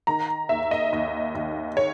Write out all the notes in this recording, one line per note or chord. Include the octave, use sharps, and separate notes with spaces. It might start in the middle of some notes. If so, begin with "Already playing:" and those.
D#3 A#5
D#2 E5
D#5
D#2
D#2
C#5